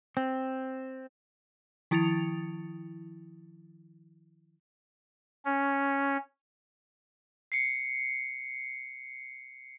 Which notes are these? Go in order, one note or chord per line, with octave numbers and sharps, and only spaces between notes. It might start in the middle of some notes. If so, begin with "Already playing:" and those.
C4
D#3 F3 E4 A6 C#7 F7
C#4
C7 C#7